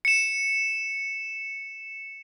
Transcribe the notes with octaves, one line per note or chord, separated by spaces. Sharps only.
C#7 E7